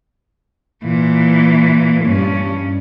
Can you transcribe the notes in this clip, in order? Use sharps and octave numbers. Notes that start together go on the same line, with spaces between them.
A#2 E3
G2 C#4